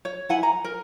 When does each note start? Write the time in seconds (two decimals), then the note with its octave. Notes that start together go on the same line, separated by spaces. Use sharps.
0.05 C#5
0.29 E4 F#5 G#5
0.43 A#5
0.64 A#4